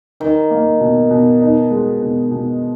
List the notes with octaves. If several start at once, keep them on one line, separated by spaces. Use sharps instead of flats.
D#3 D#4
A#3
B2
B2
D#4
G#3
B2
B2